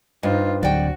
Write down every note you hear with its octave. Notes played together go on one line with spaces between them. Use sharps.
G2 D4 D#4 F4 C5 D#5
D2 D3 F#3 F#4 D5 G5